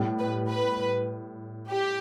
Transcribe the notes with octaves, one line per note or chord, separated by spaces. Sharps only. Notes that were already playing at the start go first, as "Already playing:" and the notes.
Already playing: A2 G3 B3
B4
B4
G4